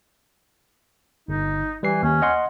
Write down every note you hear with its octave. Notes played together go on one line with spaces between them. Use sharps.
G1 D#4
E3 G3 B4 C7
D#2 C#4
D#5 F#5 C6